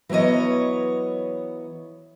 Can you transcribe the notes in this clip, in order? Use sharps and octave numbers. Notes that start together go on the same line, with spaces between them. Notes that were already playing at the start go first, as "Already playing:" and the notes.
E3 F#3 B3 C#5 D#5